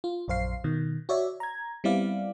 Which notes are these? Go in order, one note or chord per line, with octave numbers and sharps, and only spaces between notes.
F4
A#1 F#2 C5 F5 C7
B2 D#3
F#4 C#5 D5 E5
A#5 G#6
G3 B3 C4 E4 D5 F5